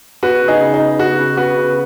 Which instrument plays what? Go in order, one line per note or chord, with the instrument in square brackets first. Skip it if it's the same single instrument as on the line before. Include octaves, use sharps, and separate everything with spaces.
[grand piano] B3 F#4 B4
C#3
D#4 G#4
C#3
D#4
B3
C#3 F#4
C#3
B3 F#4 B4
C#3